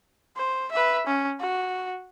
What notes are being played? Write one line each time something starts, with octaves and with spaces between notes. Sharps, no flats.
C5
B4 E5
C#4
F#4